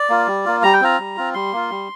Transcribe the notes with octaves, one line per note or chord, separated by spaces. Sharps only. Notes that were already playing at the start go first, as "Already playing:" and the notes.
Already playing: D5
A#3 F4
G3
A#3 F4
G3 A#5
G5
C4 F4 A#5
G3
C4 F4
G3 C6
A#3 F4
G3